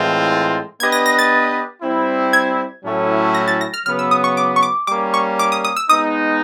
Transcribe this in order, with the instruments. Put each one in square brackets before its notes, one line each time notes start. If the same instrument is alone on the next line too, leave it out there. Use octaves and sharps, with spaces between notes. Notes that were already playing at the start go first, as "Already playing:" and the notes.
Already playing: [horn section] A2 E3 G#3 C4 F4
[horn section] B3 D4 G4 B4 D#5 [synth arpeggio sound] G#6
[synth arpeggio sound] A#6
A#6
A6
[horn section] G3 C4 E4
[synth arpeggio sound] G#6
[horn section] A2 F#3 A3 C#4 E4
[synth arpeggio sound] A#6
A6
A#6
F6
[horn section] C#3 F#3 B3 [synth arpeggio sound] F6
[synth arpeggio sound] E6
D#6
C#6
D6
C#6
D6
[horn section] G3 A#3 C#4 [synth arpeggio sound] D6
[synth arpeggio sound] C#6
D6
D#6
D#6
E6
[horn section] G#3 B3 D#4 [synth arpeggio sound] D#6